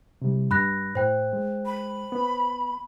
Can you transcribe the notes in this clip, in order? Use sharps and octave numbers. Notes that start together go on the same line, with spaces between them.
C3 G3
G2 B5 F#6 A#6
A2 C5 G5 F#6
G#3
B5
B3